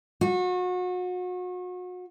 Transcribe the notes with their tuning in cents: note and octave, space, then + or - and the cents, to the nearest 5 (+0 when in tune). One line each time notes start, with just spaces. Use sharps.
F#4 -35